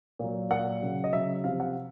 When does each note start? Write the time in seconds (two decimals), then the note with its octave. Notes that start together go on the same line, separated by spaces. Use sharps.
0.19 A#2 F#3
0.51 A#2 F#3 F#5
0.82 C#3 F#3
1.04 D#5
1.13 C#3 F#3 E5
1.44 C3 F3 F5
1.60 F#5